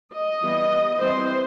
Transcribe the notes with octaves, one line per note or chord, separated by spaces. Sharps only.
D#5
E3 G3 B3
E3 G3 C4 C5